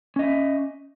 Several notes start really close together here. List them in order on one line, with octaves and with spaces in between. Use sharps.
C#4 D#5 E5